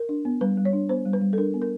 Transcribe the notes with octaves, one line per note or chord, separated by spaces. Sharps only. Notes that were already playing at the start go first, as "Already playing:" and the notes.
Already playing: A#4
D4
B3
G3 B4
G3
C#5
D4
B3 C5
G3
B4
G3
A4
D4 A#4
B3
A#4